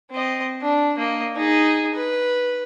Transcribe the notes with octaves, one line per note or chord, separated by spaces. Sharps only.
C4 D#5
D4
A#3 D#5
D#4 G#4
B4